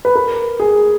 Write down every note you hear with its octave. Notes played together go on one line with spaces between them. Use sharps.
B4
A#4
G#4